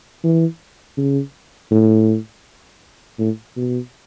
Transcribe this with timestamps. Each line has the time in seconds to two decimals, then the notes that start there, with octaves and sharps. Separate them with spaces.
0.24 E3
0.97 C#3
1.71 A2
3.19 A2
3.56 B2